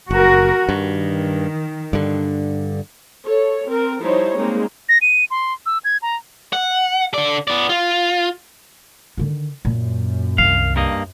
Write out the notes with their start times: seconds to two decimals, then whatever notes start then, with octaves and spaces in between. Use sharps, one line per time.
0.11 F#1 F#4 A#4
0.69 G2 D#3
1.93 G2 D3
3.25 A4 C#5
3.68 C4 A#4
4.01 F3 G3 D#4 E4 C5 C#5
4.37 G3 G#3 A#3 C4 D#4
4.89 A#6
5.02 D#7
5.31 C6
5.66 E6
5.85 G#6
6.02 A#5
6.53 F#5
7.14 D3 D5
7.48 B3 D5
7.69 F4
9.17 D3 D#3
9.65 F#2 A#2
10.38 C2 D#3 F5
10.76 G2 A#3 D#5